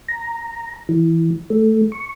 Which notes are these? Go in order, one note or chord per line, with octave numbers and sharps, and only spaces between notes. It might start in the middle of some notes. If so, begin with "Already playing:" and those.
A#5
E3
A3
C#6